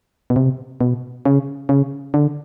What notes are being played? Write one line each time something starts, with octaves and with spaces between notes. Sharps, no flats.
B2
C3
B2
C#3
C#3
D3